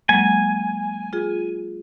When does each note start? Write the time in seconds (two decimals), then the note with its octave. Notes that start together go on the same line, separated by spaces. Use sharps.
0.09 F#3 G#3 A#3 G#5
1.13 F4 G#4